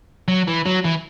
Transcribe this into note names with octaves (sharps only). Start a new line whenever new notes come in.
F#3
E3
F#3
E3